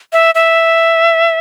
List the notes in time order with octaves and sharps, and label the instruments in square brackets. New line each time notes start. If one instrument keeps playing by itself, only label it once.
[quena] E5
E5